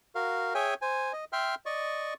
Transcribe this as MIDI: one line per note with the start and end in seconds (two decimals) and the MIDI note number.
0.15 0.54 66
0.15 0.54 70
0.15 0.54 77
0.55 0.74 68
0.55 0.74 73
0.55 0.74 76
0.55 0.74 79
0.55 0.74 80
0.82 1.13 72
0.82 1.13 80
1.13 1.25 75
1.33 1.55 76
1.33 1.55 79
1.33 1.55 84
1.33 1.55 89
1.66 2.14 74
1.66 2.14 75
1.66 2.14 85